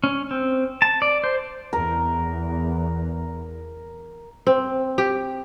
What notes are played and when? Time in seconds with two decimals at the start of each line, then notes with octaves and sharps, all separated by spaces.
0.04 C#4
0.31 C4
0.82 A5
1.02 D5
1.24 C5
1.73 E2 A#4
4.47 C4
4.98 G4